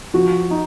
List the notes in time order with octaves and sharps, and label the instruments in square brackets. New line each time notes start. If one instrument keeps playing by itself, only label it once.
[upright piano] F3 [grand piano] F#4
[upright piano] D#4